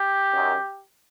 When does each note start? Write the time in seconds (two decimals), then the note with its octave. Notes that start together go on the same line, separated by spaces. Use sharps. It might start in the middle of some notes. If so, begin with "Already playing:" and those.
Already playing: G4
0.33 F#2 D#3